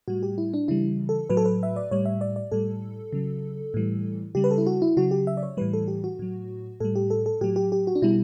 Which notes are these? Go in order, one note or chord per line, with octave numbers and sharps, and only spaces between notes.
A2 G3 F#4
G4
E4
D4
C#3 E3 G3 E4
A4
A2 F#3 B4
A4
B4
E5
D5
A2 G3 C#5
E5
D5
D5
A2 G3 A4
C#3 F#3
A2 E3 G3
C#3 G3 G4
B4
A4
E4
F#4
E4
C#3 F#3 F#4
G4
E5
D5
C#5
A2 E3 G3 B4
A4
G4
F#4
A2 F#3
A2 G3 A4
G4
A4
A4
A2 F#3 G4
G4
G4
F#4
D4
B2 G3 E4